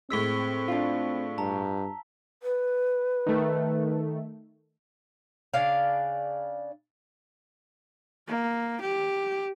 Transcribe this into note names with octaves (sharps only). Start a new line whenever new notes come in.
A2 G#3 C4 E6 B6 G7
D4 F4
G2 A5 A#5
B4
D#3 A3
C#3 D4 D5 F5
A#3
G4